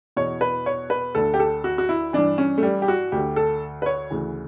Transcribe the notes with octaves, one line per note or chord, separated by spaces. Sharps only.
E2 B2 C#5
B4
C#5
B4
D2 D3 A4
G4
A4
F#4
F#4
E4
G2 E3 D4
C#4
A3
G3
G4
F#4
D2 D3 G4
A4
B4
C#5
D2 C#3 E3